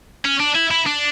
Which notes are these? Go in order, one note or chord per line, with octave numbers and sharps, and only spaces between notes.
C#4
D4
E4
E4
D4